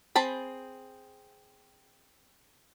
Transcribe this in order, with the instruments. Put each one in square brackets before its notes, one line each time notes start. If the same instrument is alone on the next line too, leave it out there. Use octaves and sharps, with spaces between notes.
[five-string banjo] C4 G#4 A5 B5